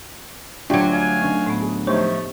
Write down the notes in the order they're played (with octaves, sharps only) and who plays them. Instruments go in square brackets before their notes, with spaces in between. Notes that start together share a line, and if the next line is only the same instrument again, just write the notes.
[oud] D2 F#3 [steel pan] D4 F4 G4 [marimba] G5
[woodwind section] F5 G#5
[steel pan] D3 C#4 D#4 [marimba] C#6
[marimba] A2 A3 B3
[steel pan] G#4
[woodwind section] F3 A3 [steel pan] D#4 C5 C#5 [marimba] G4